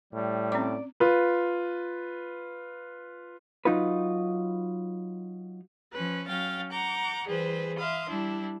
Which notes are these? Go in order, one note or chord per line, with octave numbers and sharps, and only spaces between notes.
A2 G3
C4 C#4 D5 D6
F4 B4
F#3 D#4 F4 B4
F3 C#4 B4
F#3 C#4 F5 G5 A6
F#5 A#5 D6 G6
E3 G3 G#4 B4 C5
E5 F5 C6 D#6
G3 D4 E4